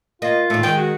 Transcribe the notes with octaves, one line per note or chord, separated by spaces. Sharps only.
A#3 F4 D#5
D#2 A2 A3
D#3 G#3 G5
F#4